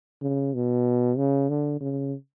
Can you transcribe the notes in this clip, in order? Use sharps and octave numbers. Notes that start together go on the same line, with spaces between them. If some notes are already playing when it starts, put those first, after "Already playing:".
C#3
B2
C#3
D3
C#3